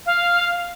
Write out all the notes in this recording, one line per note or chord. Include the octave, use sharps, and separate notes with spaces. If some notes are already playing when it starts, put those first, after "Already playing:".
F5